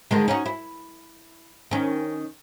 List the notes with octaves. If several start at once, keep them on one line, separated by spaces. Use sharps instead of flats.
D3 D#3 G#3
C#4 D#4 F#4
E4
D#3 C#4